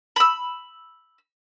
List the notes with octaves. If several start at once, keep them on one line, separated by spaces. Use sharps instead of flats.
B5 E6